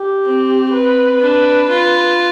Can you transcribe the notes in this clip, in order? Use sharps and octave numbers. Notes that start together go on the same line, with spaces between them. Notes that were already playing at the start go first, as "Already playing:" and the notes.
Already playing: G4
C4
B4
D4
F4